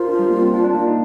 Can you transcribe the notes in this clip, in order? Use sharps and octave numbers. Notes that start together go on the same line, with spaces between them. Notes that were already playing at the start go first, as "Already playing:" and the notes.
Already playing: F4 A#4 C5
D4
G3
A#3
C4
D4
D4
A#3
D#4